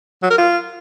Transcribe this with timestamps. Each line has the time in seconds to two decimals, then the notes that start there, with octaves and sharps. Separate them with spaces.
0.23 F#3
0.30 A#4
0.38 F4